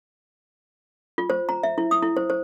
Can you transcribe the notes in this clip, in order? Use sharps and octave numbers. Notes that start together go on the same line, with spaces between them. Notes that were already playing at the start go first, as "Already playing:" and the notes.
F4
C5
A#5
E5
E4
D#6
E4
C5
C5